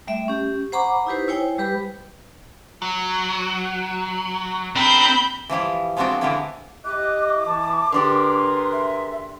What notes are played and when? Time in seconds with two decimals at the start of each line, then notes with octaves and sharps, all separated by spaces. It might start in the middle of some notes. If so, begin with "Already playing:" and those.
0.07 G3 A3 E5
0.28 C#4 G4
0.72 C5 F#5 A#5 B5 C#6 D6
1.06 D#4 E4 G4 B4 C5
1.28 E4 C5 C#5 G5 G#5
1.58 G3 G4 B4 B5
2.82 F#3
4.76 C4 D4 A#4 B5 G6
5.50 E3 F3 G3 E4
5.97 F3 G#3 B3 C4 D4 F#4
6.21 D3 E3 G3 A#3 B3 E4
6.85 E4 G4 D#5 D6 F#6
7.47 E3 A5
7.92 D3 D4 G4 G#4 A#4 B4 C6
8.72 E5